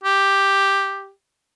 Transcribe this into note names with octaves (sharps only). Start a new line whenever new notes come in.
G4